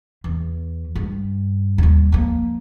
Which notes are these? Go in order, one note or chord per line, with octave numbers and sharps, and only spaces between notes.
E2
G2
D#2 G3
F3 A#3